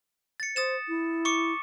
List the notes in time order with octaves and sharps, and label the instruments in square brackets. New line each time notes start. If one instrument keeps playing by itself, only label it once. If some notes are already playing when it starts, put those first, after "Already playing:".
[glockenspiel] A6 C#7
[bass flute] C5 [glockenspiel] D#6 A6 E7
[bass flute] E4
[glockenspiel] C#6 D6 C#7